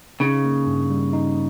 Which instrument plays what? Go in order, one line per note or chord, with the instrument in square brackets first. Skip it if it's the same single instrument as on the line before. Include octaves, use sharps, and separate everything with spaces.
[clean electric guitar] C#3 [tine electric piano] D#4
[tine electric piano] A#3
G2
G3
D#4